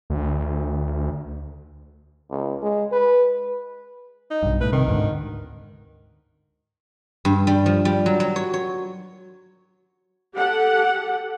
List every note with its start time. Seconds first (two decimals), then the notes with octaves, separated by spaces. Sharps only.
0.10 D2
2.31 C#2
2.62 G#3
2.92 B4
4.30 D#4
4.43 B1 G2
4.61 A2 B4
4.72 C3 D#3
4.87 D2 G#2 D3
7.25 G2
7.47 G3
7.66 F3
7.85 G3
8.06 F#3
8.20 F#3
8.36 C#5
8.54 C#5
10.36 G4 A4 F#5